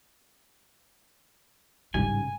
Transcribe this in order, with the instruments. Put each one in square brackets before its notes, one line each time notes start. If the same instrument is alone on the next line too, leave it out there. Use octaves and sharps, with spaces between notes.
[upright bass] A1 C#3 [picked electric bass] G#2 G3 [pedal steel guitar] G#5